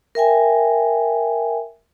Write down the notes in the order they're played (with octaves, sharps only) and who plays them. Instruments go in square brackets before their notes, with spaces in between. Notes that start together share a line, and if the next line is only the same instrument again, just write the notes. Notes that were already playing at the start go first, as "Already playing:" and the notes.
[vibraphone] A#4 E5 G5 G#5